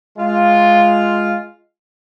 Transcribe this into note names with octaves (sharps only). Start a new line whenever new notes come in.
G#3 F4